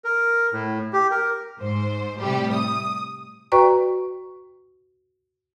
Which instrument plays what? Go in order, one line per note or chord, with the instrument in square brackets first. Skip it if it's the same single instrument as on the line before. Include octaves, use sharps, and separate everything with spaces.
[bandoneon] A#4
A2
G4
A#4
[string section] G#2 C5
A2 C3 G3 G4
D#6
[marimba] F#4 B4 D5 G5 A#5 C#6